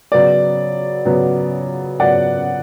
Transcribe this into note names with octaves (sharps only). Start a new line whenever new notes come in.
C#3 F#3 B3 D5
C#3 F#3 B3
C#3 F#3 B3 D5 F#5